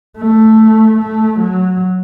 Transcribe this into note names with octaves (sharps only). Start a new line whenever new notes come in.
A3
A3
F#3